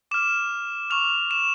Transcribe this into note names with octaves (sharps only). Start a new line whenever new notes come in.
D6 F6 E7
C#6 F6 F7
E7